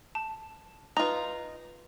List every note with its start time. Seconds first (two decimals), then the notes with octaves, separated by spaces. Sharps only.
0.15 A5
0.97 D#4 F4 B4 A#5